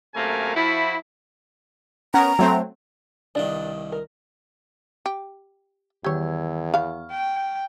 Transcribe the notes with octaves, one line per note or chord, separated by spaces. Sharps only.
F#2 C3 A3 A#3 A#4 G#5
F3 E4 F#4
B3 C#4 A#4 A#5
F#3 A3 C4
C2 G2 D#3 D4
A#4
G4
E2 D#3 G4 C#5 E6 G#6
B3 F5 C#6 F6
G5